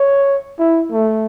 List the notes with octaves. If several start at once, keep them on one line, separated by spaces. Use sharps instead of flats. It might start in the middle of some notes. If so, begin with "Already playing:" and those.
Already playing: C#5
E4
A3